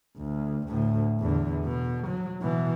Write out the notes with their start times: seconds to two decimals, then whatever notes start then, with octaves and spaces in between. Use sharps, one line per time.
0.17 D2
0.68 D2 A2
1.20 E2 D3
1.64 B2
2.07 F#3
2.41 B2 E3